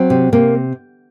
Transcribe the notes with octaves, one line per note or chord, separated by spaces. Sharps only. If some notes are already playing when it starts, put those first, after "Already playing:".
Already playing: F#3 C4
C3
C3 A#3